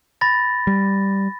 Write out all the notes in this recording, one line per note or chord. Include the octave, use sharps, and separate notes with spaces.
B5 A6 A#6
G3